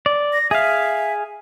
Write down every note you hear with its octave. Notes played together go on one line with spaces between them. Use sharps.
D5
A#6
G#4 E5 F5